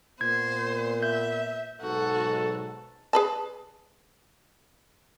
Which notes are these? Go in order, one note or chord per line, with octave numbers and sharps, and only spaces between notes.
A#2 B3 C5 G#6
E5 G6
B1 G#2 F#4 A4
G#4 B4 A5